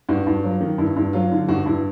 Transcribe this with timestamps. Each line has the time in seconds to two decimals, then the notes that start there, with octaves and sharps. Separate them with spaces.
0.09 G2 F#4
0.27 G2
0.43 F#3 F4
0.61 D#3
0.78 G2 E4
0.96 G2
1.13 F#3 F4
1.32 D3
1.48 G2 F#4
1.66 G2 E4